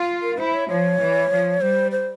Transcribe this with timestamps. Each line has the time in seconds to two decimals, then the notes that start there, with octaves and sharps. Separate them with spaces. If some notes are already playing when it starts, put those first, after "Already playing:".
Already playing: F4
0.22 A#4
0.38 E4 C5
0.54 C#5
0.69 F3 C#5
1.00 E3
1.30 F3
1.61 G3 C5
1.92 C5